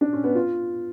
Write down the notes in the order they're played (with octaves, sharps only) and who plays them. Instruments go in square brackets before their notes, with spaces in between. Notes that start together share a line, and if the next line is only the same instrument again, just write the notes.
[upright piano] D4
C#4
B3
F4